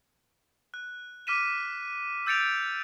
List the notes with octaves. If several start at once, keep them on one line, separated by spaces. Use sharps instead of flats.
F#6
D6 F6 B6 D#7 E7
E6 G6 A6 C#7 D7 F7